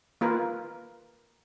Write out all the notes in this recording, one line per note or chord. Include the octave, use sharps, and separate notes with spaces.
A#3 F4 A#4 B4